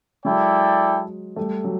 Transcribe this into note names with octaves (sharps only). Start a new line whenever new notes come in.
F#3 G#3 E4 A4 D5 G5
G3 A3
F#3